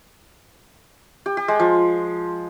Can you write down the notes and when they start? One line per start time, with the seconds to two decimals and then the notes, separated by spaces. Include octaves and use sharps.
1.26 G4
1.37 G4
1.48 G#3
1.59 F3